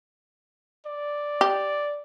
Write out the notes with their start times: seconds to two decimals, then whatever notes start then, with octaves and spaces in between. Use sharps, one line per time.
0.86 D5
1.41 G4